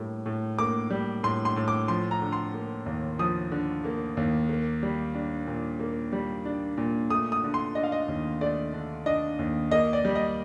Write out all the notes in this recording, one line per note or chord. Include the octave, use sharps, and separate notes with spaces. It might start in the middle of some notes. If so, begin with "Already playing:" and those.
Already playing: A2 G3 A#3
A2
A#3 D6
G3
A2 C6
C6
A2
D6
F3 C6
A#5
D3
C6
A#3
D#2
F3 D#6
D3
A#3
D#2
A#3
G3
D4
A#2
A#3
G3
D4
A#2
A3 D#6
D#6
D3
C6
D4 D#5
F5
D#5
D#2
A3 D5
D3
D4 D#5
D#2
A#3 D#5
D5
G3
D#5